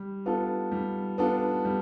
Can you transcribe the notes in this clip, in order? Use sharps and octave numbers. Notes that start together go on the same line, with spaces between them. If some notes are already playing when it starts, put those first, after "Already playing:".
Already playing: G3
B3 D4 F4 A4
G3
B3 D4 F4 A4
G3